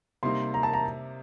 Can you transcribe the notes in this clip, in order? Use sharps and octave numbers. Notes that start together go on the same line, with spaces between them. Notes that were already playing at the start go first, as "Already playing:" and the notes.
C3 G3 A#3 D#4 C6
A#5
A5
A#5